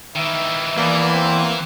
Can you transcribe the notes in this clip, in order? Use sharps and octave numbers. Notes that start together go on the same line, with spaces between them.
D#3 E3 E5
E2 E3 A#3 D5
C4